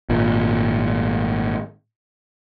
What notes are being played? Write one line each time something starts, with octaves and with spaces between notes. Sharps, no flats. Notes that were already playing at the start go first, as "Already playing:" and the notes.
G#1 A#2